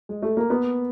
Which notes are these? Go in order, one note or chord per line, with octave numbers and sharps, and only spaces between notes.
G#3
A3
A#3
B3